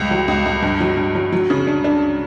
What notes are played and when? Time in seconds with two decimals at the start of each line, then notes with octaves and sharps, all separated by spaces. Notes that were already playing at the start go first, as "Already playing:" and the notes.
Already playing: C#2 G3
0.11 F#3
0.28 C#2
0.46 C#2
0.63 G2
0.80 F#3
0.97 G2
1.15 F#3
1.32 F#3
1.50 C#3
1.67 D4
1.84 D4